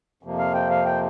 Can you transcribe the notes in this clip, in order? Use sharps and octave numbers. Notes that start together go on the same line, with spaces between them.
F2 C3 F3 A#3
F5
G5
F5
G5